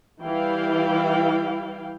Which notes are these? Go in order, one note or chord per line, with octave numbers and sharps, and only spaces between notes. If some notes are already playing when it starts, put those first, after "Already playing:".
E3 G3 E4 F5 G5